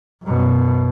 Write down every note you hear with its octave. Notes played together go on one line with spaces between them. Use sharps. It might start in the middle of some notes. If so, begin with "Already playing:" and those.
F#2 B2